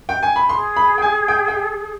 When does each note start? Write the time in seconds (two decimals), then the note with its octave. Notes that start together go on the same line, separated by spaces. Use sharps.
0.09 G5
0.23 G#5
0.36 B5
0.49 G#4 C6
0.76 B5
0.98 G5
1.02 G#5
1.28 G5
1.48 G5